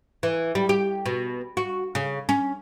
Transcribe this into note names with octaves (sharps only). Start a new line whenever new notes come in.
E3
G3
G4
B2
F#4
C#3
C#4